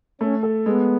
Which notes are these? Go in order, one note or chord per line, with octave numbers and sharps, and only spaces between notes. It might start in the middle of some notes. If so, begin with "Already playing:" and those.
A3 C#4
A4
G#3 B3